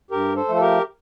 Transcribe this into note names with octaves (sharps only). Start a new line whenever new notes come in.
G2 G4 A#4
A4 C5
F3 A3
A4
G4 A#4